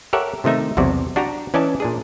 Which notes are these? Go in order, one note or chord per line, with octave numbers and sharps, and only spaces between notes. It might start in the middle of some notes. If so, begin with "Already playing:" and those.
G4 A4 A#4 C#5 E5 F#5
C3 D#3 A3 D#4 E5
B1 E2 C3 F#4 D5
D4 F#4 G4 G5 A#5
E3 C#4 D5 D#5 G#5 A5
A#2 D4 G#4